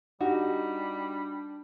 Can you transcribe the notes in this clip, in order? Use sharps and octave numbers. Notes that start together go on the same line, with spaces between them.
G3 D4 D#4 F#4 G4